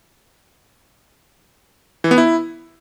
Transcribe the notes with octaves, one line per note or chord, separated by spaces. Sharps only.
E3
B3
E4